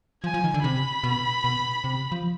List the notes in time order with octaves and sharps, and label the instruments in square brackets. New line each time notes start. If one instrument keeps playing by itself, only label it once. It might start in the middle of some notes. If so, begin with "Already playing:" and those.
[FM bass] F3 [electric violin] G#5
[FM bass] F3
D#3
D3
[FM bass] C3 [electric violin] B5
[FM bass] B2
B2
C3
F3